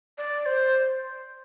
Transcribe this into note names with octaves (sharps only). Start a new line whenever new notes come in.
D5
C5